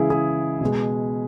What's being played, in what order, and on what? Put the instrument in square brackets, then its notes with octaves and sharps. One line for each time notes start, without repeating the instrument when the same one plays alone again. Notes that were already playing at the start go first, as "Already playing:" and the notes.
Already playing: [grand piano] C#3 E3 G#3 E4 G#4
E4 G#4
B2 G#3